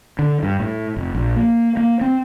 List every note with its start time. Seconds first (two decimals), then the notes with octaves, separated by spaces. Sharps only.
0.19 D3
0.43 G2
0.60 A2
0.96 F1
1.15 A#1
1.36 A#3
1.77 A#3
2.01 C4